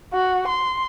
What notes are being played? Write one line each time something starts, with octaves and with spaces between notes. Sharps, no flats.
F#4
C6